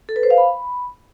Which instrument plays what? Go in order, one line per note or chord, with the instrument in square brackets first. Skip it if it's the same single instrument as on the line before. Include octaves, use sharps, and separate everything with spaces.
[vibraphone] A4
B4
C5
F5
B5